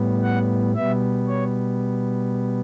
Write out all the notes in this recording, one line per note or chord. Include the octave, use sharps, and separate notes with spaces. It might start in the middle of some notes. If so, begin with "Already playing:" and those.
Already playing: A2 G3 B3
F#5
B2 G3 B3 E5
C#5